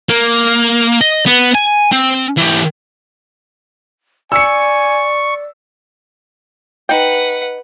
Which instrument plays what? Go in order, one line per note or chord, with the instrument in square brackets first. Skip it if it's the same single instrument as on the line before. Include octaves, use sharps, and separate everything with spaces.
[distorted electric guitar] A#3
D#5
B3
G#5
C4
E3 G4
[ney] D5 [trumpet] G#5 [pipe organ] C#6 [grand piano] E6 C#7
[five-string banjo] D#4 G5 [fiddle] B4 F#5